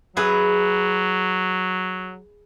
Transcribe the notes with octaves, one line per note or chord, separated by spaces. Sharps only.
F#3 G#4 B4 E5